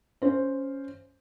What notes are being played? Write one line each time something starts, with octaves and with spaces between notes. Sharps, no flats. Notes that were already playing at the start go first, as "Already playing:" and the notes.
C#4 C5